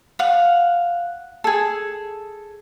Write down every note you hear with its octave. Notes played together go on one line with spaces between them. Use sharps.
F5 F#5
G#4 A4